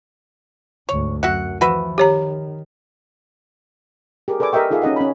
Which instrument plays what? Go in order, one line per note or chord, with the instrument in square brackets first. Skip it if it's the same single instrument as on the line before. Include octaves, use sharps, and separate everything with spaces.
[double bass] D2 G#2 [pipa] C#5
[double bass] F#2 [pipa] F#4 E5 F#5
[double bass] E3 F3 [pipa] F#4 B4 E5
[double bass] D#3 [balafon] G4 C#5 A#5
[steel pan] G4 G#4 A#4
A4 B4 D5 G#5 D6
G4 A#4 D#5 E5 G5 C#6
D#4 F4 G#4 A4 E5 F5
C#4 D#4 D#5 F#5
C#4 B5